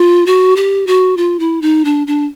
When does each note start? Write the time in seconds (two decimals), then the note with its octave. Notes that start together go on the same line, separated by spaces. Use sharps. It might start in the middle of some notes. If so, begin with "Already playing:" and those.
Already playing: F4
0.26 F#4
0.56 G4
0.87 F#4
1.17 F4
1.39 E4
1.62 D#4
1.85 D4
2.07 D4